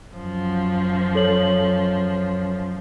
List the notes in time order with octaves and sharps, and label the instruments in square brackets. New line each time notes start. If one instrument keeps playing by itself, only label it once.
[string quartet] F#2 F3
[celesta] A4 C#5 F#7